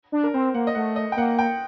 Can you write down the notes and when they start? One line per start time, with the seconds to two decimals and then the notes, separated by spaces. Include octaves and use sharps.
0.12 D4
0.24 A#4
0.34 C4 C5
0.54 A#3 F#5
0.67 D#5
0.75 A3 F#5
0.96 D#5
1.12 G5
1.17 A#3 F#5
1.39 G5